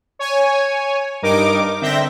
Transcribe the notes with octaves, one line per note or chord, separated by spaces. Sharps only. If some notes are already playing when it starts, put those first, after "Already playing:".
C#5 G#5
G2 D#4 A#4 D6
D3 C4 E5 G6 A#6